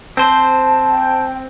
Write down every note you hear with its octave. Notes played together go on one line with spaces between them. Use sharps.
C4 C5 A5
G5